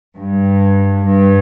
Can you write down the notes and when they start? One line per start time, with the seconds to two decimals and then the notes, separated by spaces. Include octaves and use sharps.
0.17 G2
1.07 G2